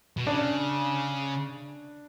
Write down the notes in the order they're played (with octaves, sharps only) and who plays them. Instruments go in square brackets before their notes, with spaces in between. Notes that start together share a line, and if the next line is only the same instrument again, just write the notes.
[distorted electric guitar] B2
[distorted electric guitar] C#3 [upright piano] D4